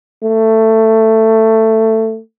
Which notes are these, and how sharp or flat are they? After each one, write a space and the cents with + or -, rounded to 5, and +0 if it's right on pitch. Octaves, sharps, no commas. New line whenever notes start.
A3 +15